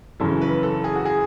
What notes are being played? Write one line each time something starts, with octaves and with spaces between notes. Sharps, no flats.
F#2 C#3 E3 A4
B4
A4
G#4
F#4
G#4